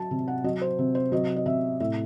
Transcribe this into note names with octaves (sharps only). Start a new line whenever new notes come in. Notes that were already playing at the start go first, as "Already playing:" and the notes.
Already playing: F#3 A5
C3
F#5
F#3 D#5
C5
C3
C5
F#3 D#5
D#5
C3 E5
A2 E5